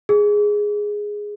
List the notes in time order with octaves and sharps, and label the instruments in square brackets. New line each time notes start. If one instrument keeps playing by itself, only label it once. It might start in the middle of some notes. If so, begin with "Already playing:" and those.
[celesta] G#4